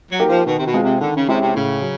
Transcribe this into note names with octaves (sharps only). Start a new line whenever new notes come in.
F#3
A#3 D#4 G4 A#4
F3
B2 D#3
C3
B2
G#3 C4 F4
C3
D3 D#3
C#3
C3 G#3 C#4 E4 G4
C3
A2 C#3
F#3